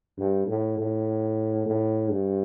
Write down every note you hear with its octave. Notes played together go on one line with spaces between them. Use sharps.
G2
A2
A2
A2
G2